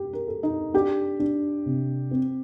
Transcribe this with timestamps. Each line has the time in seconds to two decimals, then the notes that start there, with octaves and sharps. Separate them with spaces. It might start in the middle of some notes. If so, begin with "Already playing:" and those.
Already playing: G4
0.13 A#4
0.28 A4
0.43 D#4
0.74 D4 G4
1.20 D4
1.66 C3
2.11 C4